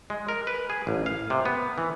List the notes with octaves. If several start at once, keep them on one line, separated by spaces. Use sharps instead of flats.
G#3
A#4
B4
G#4
A1
F5
C3
B3
E3